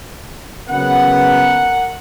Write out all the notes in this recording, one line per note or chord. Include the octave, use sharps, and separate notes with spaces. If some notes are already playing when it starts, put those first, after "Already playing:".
C#3 F#3 B3 A#4 F#5